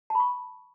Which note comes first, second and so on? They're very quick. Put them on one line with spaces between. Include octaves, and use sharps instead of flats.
A5 B5 C#6